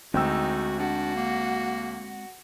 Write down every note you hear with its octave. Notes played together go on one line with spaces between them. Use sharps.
D2 G#3 B3 C4 D#4 F#4 G5 E6
D4 F#4
A#3